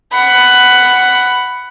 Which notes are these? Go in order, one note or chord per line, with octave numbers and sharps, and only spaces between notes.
F#5 B5